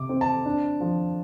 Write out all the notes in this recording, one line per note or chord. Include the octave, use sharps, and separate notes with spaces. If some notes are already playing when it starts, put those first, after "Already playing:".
Already playing: C3 D6
C4
A5
D4
F3